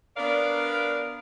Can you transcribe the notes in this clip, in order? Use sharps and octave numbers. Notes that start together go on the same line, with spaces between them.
B3 D4 A#4 D5 F5